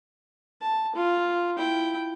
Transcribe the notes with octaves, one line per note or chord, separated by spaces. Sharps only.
A5
F4
E4 G5